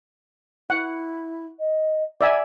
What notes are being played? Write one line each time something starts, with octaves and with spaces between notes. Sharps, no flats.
E4 F#5
D#5
D5 E5 F#5 G#5